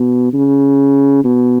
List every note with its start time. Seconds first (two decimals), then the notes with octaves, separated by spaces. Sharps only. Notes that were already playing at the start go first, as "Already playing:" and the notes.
Already playing: B2
0.33 C#3
1.24 B2